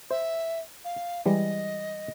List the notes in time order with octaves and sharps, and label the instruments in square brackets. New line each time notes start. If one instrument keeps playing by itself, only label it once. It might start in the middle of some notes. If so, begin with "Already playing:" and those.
[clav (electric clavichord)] C5 [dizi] E5
[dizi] F5
[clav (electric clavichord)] E3 G3 G#3 [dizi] D#5